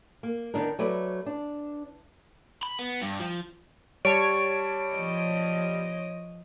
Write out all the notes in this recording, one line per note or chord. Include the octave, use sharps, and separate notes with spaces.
A#3
D#3 B3 D4 D#4 A#4
F#3 A3 B4 D5
D4
B5
B3
G2
F3
G3 C#5 A5 D7
F3 D#5